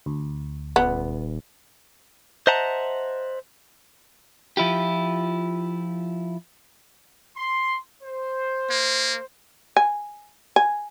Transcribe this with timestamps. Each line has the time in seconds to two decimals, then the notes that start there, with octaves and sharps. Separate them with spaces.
0.06 D2
0.76 D#1 B3
2.47 C5 D#5 E5 F#5 A5 A#5
4.57 F3 E4 F4 G4
7.37 C6
8.03 C5
8.70 A#3
9.76 G#5
10.56 G#5